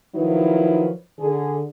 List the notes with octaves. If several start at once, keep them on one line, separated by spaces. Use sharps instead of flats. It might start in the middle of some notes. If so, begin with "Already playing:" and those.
D#3 F3 F#3 D#4 E4 B4
D3 G#4